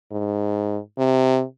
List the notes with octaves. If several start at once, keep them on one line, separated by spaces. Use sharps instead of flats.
G#2
C3